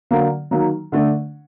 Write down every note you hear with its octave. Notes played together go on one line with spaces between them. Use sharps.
D3 F#3 A#3
D#3 F#3 A#3
D3 A3 D4